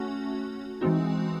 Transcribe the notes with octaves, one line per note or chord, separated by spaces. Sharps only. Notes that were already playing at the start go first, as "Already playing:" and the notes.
Already playing: A3 C#4 F#4
E3 G#3 C4 D#4 F#4